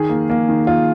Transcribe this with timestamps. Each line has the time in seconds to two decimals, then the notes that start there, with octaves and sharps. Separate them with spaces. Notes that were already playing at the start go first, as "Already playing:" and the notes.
Already playing: D#3 G#4
0.09 A#3
0.30 A#3
0.49 D#3
0.67 A#3 F4